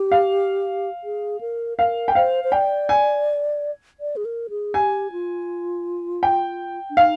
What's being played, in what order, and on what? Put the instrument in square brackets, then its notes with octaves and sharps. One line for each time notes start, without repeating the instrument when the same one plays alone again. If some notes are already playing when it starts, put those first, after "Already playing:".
Already playing: [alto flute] G4
[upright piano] F5
[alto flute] G#4
A#4
[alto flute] A#4 [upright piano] F5
[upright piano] G5
[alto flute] C5 [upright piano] F5
[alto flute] C5
[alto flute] D5 [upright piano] G5
[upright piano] G#5
[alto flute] D5
G#4
A#4
G#4
[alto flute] G4 [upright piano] G#5
[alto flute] F4
[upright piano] G5
[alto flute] D4
[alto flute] D#4 [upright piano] F5